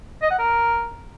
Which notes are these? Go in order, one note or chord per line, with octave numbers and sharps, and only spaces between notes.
D#5
F#5
A#4